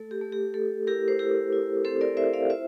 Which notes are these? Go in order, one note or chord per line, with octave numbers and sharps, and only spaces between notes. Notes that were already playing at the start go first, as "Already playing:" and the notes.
Already playing: A3 A4
G4
A3
G4
A3 A4
E4 G4 A#4
C5
E4 G4 A#4
E4
C4 A4 C5
A#4 D5
E4 C5 E5
D5 F5
F4 C5 E5